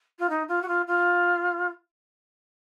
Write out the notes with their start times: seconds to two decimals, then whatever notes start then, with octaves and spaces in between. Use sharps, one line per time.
0.19 F4
0.29 D#4
0.48 F4
0.62 F#4
0.68 F4
0.87 F4